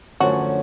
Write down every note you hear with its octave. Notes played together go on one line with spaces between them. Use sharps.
F#2 D3 F3 A3 C#4 F#4